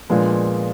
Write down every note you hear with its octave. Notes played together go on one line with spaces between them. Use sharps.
A#2 F3 G#3 B3 D4